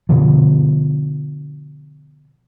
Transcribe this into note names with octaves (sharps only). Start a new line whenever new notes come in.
B2 D3 F3